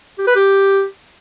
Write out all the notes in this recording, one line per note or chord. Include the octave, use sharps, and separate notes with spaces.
G4
B4
G4